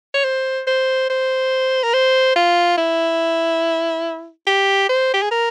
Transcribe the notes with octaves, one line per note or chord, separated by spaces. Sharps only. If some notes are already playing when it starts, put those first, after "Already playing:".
C#5
C5
C5
C5
A#4
C5
F4
E4
G4
C5
G4
G#4
A#4